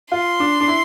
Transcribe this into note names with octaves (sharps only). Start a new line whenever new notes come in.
F4 C6
D4
D4
E4